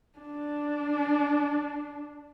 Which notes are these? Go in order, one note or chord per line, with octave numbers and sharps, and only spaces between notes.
D4